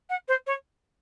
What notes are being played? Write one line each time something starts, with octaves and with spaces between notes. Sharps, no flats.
F#5
C5
C#5